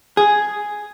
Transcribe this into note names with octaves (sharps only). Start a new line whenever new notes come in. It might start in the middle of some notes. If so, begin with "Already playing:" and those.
G#4